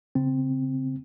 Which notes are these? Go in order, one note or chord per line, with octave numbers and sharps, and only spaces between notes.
C#3 C4